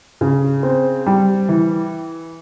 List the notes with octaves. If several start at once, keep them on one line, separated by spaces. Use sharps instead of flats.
C#3
C4
G3
E3